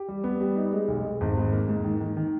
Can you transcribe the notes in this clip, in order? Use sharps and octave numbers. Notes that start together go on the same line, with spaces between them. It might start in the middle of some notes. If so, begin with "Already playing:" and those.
Already playing: G4
G3
B3
G3
D#4
G#3
B1
G#3
G#1
G#2
A#3
G#2
D#3
D#3
D#3